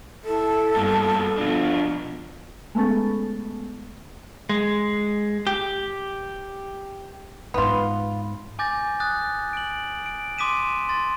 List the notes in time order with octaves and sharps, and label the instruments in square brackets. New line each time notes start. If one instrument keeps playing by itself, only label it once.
[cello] E4 [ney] A4
[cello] G2 [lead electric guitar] B2 A#3
[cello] B2 F3 [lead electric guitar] D4 F4
[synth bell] G#3 A3 B3 C#4 A4
[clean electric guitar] G#3
G4
[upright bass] G#2 G#3 [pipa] B3 F4
[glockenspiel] G#5 D6 G6 A6 A#6
D#6 F#6 A6
D7 F#7
D7
C6 D6 D#6 B6 D#7 E7
C6 A6